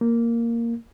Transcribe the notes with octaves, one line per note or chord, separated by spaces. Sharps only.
A#3